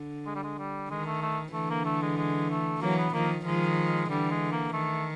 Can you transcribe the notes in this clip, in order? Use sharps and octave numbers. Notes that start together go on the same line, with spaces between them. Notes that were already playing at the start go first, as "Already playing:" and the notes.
Already playing: D3
G#3
G3
G#3
G3
D#3 G#3
A3
A3
D3 E3 A3
A#3
A3
G#3
G#3
A3
E3 F#3 A#3
B3
D#3 F3 A#3
D#3 F3 G#3
D3 E3 G3
G#3
A#3
D#3 A3